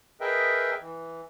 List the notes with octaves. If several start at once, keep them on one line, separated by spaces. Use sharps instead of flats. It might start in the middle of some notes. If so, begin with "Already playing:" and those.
G#4 A#4 B4 D#5 E5 G5
E3